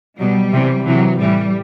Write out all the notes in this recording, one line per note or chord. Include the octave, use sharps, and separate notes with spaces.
B2 F#3 G3
C3 E3
C3 E3 F#3
A2 E3 G3